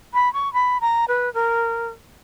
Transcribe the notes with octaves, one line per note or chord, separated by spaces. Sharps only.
B5
C#6
B5
A#5
B4
A#4